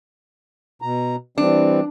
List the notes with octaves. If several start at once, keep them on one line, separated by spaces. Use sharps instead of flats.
B2 A#5
E3 G3 C4 D4